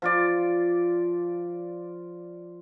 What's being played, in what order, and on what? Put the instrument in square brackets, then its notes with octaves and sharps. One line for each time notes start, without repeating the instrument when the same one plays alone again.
[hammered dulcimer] F3 F4 D5